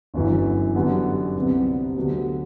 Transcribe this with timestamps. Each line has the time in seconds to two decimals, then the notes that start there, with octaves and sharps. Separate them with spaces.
0.14 G1 F#2 E3
0.75 F#2 D3 G3 B3
1.36 C2 C3 G3 B3
1.96 D2 D3 F#3 B3